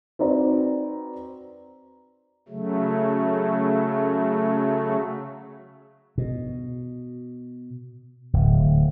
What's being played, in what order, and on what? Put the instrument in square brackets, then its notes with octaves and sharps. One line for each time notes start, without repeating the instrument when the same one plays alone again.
[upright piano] C4 D#4 F#4 B4 D5 A#5
[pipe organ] C#3 F#3 A3
[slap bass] B2
D1